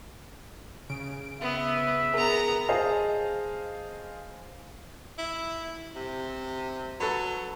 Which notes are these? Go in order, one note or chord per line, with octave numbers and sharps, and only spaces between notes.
C#3 D7
B3 E5
B3 G#4 A#4 A#5
G#4 C5 D#5 F5 A5
E4
C3
F#3 A4 B4